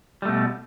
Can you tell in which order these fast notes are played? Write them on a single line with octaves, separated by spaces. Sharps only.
G3 A3 B2